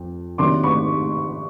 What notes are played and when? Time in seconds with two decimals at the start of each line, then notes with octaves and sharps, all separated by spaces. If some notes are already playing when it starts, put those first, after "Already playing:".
Already playing: F2
0.38 C3 D#3 F#3 A#3 D4 C6 D6
0.63 B5 C#6